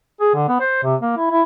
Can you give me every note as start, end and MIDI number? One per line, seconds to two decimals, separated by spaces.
0.20 0.30 68
0.35 0.48 50
0.48 0.56 59
0.60 0.80 72
0.83 0.95 48
1.01 1.15 58
1.17 1.29 64
1.31 1.42 64